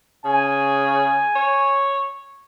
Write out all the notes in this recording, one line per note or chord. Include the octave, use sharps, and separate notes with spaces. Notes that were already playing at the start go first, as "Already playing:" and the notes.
C#3 G#5
C#5